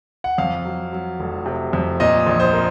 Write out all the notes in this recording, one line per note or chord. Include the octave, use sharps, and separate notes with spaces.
F#5
F2 F5
F#3
F#3
F1
C3
F2
A#2 D#5
A#1
C5
A#3